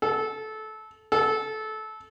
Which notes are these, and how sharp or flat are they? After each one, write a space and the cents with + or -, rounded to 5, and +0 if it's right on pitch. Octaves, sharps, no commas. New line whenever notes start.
A4 -20
A4 -20